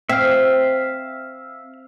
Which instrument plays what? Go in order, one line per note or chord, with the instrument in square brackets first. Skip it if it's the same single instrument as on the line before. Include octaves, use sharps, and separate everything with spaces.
[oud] C4 [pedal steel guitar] E5 F5